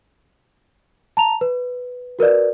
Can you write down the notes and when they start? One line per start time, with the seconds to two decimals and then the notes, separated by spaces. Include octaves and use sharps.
1.17 A5 A#5 F7
1.41 B4
2.19 F#4 A#4 B4 D5